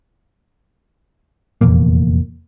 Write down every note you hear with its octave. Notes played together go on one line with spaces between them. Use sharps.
F1 E2 A#2 A#3